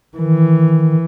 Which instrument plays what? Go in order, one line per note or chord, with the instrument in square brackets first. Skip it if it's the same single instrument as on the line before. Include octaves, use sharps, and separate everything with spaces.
[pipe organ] D#3 [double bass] E3